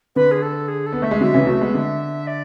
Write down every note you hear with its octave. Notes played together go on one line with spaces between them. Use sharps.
D3 B4
G#4
A4
G#4
A4
B3
A3 E5
G#3
D3 F#3 E5
C#3 E3
F#3 A3
G#3 B3
D3
D5